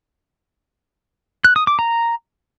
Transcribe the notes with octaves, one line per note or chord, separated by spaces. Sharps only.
F#6
D#6
D6
A#5